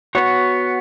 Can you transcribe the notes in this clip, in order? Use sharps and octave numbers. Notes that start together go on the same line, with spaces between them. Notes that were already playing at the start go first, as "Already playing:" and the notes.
B3 F#4 C#5